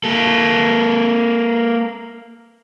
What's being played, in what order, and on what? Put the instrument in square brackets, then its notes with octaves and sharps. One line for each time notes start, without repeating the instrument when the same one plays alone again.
[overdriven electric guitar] A#3 A4